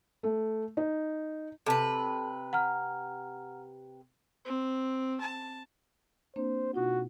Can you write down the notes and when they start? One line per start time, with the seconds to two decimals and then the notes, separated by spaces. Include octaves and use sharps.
0.23 A3
0.77 D#4
1.66 C3 A4 B4 A5
2.53 F#5 A#5 F6
4.45 C4
5.21 A5
6.36 A#3 C4 D4 C5
6.74 B2 D#4 F4 F#4